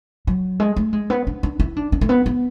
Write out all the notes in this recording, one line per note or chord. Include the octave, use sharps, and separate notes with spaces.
F#3
G#3
A3
G#3
B3
D4
D4
E4
D4
D4
A3
B3
B3